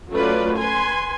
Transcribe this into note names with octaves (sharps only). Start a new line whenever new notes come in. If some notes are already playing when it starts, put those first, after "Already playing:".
F#3 A3 C#4 F4 B4 D5
B4 G#5 C6